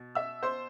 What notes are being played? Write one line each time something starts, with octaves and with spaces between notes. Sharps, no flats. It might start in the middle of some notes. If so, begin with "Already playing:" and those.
Already playing: B2
E5 E6
C5 C6